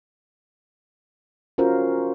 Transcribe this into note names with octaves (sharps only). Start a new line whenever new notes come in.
C#4 F4 F#4 A#4 C5